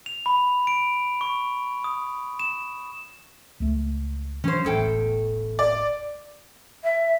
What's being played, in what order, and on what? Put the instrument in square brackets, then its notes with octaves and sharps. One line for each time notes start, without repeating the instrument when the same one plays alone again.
[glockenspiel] F7
B5
D7
C#6
D#6
E7
[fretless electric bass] C#2 A3
[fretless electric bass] E3 F#3 [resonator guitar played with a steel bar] C#4 C5
[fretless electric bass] E1 A1 [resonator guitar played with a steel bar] E2 A4 G5
[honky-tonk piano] D5
[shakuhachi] E5